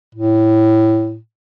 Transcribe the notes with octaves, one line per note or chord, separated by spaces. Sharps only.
A2